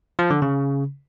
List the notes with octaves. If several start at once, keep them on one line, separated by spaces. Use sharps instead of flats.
F3
D3
C#3